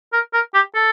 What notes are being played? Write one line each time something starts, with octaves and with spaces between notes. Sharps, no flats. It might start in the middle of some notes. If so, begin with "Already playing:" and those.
A#4
A#4
G4
A4